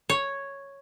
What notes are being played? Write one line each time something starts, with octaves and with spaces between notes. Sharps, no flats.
C#5